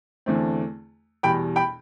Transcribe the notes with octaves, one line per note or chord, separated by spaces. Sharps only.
E2 D3 A3 C4
E2 B2 G3 G5 B5
G5 B5